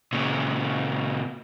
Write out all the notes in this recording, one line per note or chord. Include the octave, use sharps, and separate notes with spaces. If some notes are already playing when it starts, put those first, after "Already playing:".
A#2 C#3